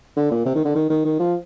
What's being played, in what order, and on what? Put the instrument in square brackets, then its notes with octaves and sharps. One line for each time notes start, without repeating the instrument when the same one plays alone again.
[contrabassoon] D3
A#2
C3
D#3
D3
D#3
D#3
D#3
F3